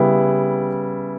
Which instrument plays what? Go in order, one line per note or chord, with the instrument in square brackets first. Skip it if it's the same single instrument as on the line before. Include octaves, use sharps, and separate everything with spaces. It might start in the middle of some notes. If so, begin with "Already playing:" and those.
Already playing: [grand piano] C#3 G3 B3 E4